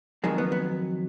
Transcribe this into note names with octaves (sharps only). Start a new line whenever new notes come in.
F2 D#3 F#3 G#3
B3
B3